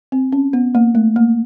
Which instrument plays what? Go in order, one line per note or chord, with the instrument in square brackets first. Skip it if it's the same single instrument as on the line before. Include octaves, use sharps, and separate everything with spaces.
[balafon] C4
C#4
B3
A#3
A3
A#3